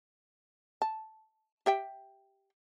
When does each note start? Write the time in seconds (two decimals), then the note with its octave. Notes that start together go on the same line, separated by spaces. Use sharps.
0.82 A5
1.66 G4 E5 G5